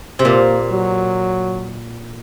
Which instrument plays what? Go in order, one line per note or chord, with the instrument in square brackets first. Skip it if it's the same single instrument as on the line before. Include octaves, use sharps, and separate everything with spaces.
[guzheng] C3
[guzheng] A#2 [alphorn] A#3
[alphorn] F#3